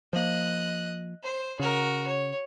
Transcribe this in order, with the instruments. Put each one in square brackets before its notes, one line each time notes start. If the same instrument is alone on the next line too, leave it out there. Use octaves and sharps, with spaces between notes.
[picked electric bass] F3 A#3 [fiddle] D#5 F#6
[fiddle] C5
[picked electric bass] C#3 [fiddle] F#4 A#4
[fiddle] C#5